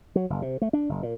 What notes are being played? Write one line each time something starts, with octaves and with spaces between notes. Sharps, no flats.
F#3
F#1
C3
A3
D4
F#1
A#2